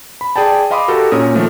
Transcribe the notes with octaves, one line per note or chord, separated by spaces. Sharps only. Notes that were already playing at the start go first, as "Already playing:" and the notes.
B5
G#4 D5 G5 A5
D#5 F5 B5 C6 D6 D#6
F#4 G4 A4 A#4
A#2 C#4 A#4 D#6
D#3 F3 A3 A#3